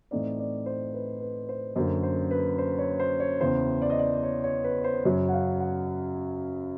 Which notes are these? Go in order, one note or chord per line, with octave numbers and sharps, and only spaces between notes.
A2 E3 A3 C4 D#4 D5
D5
C5
B4
B4
C5
F#2 D3 F#3 A#3 C5
C5
B4
C5
C#5
C5
C#5
E2 C#3 E3 C5
D5
D#5
D5
C#5
C#5
B4
C5
F#2 C#3 F#3 C#5
F#5
F5
F#5